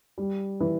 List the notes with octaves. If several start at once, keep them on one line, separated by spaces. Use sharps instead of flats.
G3
E3